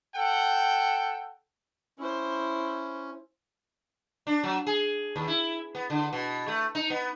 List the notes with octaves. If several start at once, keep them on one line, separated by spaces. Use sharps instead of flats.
A4 F#5 G5
C#4 E4 C5
D4
F#3
G#4
D#2
E4
B3
D3
B2
A3
D#4
B3